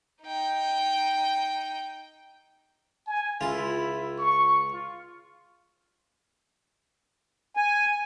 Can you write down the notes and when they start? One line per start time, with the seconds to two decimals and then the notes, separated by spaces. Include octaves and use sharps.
0.23 D#4 G5
3.07 G#5
3.41 C#2 E4 F4
4.18 C#6
4.73 F4
7.57 G#5